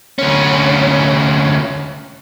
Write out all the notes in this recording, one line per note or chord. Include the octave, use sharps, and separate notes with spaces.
D2 C#4